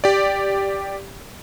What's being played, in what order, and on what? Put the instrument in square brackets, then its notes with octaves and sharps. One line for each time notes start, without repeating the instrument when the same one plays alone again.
[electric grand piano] G4 D5